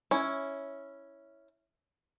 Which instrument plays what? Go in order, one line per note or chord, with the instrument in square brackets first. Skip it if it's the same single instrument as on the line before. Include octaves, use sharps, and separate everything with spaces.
[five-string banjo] C#4 E4